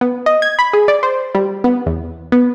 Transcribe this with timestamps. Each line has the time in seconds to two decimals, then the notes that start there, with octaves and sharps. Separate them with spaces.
0.01 B3
0.26 D#5
0.42 G#6
0.59 B5
0.73 G#4
0.88 D5
1.03 C5
1.35 G3
1.64 B3
1.86 E2
2.32 B3